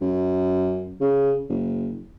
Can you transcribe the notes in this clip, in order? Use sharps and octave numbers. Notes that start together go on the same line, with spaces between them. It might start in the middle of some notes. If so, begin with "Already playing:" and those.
F#2
C#3
F#1